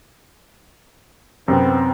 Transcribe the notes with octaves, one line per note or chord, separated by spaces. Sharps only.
F#2 C3 B3 C4